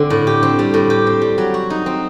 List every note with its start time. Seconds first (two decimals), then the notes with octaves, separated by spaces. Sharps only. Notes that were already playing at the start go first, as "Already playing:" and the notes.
Already playing: D3 C4
0.10 A2
0.27 G4
0.43 C4
0.59 G3
0.74 A2
0.90 G4
1.07 C4
1.22 G3
1.38 F#3
1.54 F#4
1.70 D#4
1.86 C4